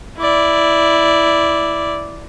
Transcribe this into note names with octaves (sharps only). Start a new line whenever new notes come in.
E4 D5